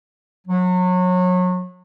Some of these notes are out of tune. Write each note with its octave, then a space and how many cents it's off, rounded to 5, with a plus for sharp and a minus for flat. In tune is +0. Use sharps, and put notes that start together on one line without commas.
F#3 -30